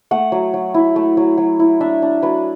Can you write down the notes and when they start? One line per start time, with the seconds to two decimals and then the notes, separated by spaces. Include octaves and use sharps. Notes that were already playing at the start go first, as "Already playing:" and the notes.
0.11 A3 F#5
0.32 F#3
0.54 F#3
0.74 E4
0.96 A3
1.17 F#3
1.38 F#3
1.59 E4
1.80 D4 E5
2.02 D4
2.22 F#3 B4